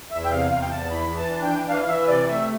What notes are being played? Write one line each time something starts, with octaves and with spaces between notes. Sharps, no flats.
E2 E5
G5
C3 F5
E2 F5
G5
E2 A5
E3 B5
E3
A5
D4
G5
E3
E3 F5
F5
E3 E5
C3 D5
A3 E5